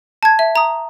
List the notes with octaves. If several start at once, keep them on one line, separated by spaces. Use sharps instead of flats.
A5 G#6
E5
A#5 D#6